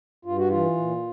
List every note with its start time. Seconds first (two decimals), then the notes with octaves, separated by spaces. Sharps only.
0.25 G2 F4
0.37 F#4
0.49 E3 F4
0.77 A#2